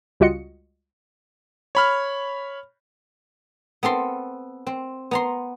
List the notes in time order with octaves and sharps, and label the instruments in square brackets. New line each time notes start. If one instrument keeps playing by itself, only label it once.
[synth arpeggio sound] C#2 G3 F4 F#4 D#5 C#7
[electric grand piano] C#5 B5 F6
[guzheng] B3 C4 A4 C6
C4
B3 A#5 C6